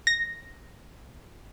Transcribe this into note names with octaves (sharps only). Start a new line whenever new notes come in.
A#6